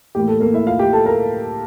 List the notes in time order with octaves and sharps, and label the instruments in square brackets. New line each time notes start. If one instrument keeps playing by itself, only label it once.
[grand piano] A2 E3 A#3 G4
A4
A#3 A#4
E4 E5
F4 F5
G4 G5
A4 A5
A#4 A#5